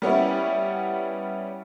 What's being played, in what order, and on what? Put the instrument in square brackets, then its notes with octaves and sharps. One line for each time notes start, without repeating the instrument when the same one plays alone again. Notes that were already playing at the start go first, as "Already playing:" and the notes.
[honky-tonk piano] G3 B3 C#4 E4